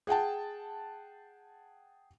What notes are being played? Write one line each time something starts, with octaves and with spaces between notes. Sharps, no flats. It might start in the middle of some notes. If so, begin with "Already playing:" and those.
G#4 F#5 G5 A5